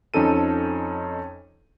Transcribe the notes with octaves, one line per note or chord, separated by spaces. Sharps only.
F2 C#4 D#4 A4 D#7